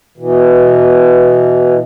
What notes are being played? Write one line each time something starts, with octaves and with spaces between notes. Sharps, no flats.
B2 E3